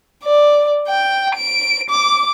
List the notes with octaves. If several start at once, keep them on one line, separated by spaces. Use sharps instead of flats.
D5
G5
D7
D6